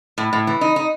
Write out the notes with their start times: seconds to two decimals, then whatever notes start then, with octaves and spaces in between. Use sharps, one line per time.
0.18 A2
0.33 A2
0.47 E3
0.61 D#4
0.76 D#4